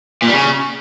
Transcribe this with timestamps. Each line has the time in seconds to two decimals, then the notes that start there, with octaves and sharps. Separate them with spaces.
0.22 A#2
0.28 G3
0.34 C#3